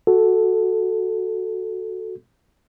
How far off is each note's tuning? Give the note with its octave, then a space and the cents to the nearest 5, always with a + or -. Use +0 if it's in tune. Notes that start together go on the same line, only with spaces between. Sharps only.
F#4 +0 A4 +0